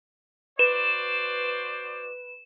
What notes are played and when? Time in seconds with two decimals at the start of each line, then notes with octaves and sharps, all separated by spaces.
0.59 F#4 B4 C5 D5 E7